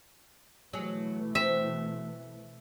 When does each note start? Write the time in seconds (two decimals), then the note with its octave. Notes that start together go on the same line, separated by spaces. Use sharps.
0.73 B2 E3 F#3 A3 G#4
1.35 C4 E5